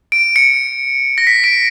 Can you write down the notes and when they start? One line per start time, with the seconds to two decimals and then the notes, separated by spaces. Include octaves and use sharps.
0.12 D7
0.36 C#7
1.18 A#6
1.27 B6
1.44 D7